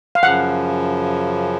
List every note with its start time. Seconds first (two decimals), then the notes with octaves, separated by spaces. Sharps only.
0.15 F5
0.23 F#2 C#3 F3 F#5